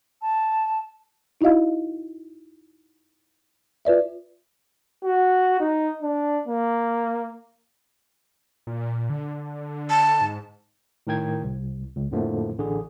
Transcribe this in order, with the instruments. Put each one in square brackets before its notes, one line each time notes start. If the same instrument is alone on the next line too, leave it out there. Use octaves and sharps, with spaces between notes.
[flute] A5
[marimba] D#4 E4 F#4 D#5 F5
F4 B4 D5 E5
[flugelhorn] F#4
D#4
D4
A#3
[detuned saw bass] A#2
D3
[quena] A5
[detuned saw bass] G#2
[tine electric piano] A2 D#3 A#4 G5 G#6
C2
C#2
F2 A2 D3 F3 A3 A#3
A1 D3 G#4